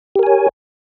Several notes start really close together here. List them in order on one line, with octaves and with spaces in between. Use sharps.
G4 A#4 G#5 C#5